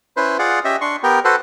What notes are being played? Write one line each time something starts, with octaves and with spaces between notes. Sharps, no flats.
C#4 E4 B4 C5
F4 G#4 D5 F5 F#5
C#4 G4 D#5 E5
D4 C6 C#6
B3 G4 A#4 G5
F#4 A4 B4 C5